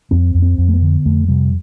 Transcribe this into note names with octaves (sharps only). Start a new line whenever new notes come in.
F2 C4
F2
C4
F2
A3
B3
D3
F2 A3
C3 G3